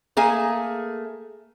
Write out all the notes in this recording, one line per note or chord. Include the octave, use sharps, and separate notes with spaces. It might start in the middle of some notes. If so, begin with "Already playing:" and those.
A3 A#3 G#4 G#5